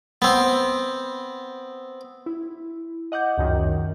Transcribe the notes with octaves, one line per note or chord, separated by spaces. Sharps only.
B3 C4
E4
D#5 F#5 D6 G6
C#2 F#2 D#3